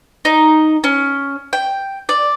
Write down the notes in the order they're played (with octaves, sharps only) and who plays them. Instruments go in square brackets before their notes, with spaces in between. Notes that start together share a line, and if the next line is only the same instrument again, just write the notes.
[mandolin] D#4
C#4
G5
D5